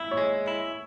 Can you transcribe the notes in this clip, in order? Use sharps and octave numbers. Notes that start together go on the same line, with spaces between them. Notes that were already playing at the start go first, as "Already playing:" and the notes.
Already playing: E4 E5
C#5
G#3
E4